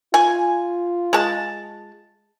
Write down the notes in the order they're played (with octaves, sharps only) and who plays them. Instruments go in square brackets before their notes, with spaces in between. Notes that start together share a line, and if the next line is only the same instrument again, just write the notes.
[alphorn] F4 [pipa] G#5
[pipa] G#3 A5